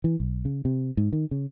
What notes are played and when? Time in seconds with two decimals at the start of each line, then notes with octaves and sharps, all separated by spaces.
0.04 E3
0.20 B1
0.45 C#3
0.65 C3
0.97 G#2
1.13 D#3
1.31 C#3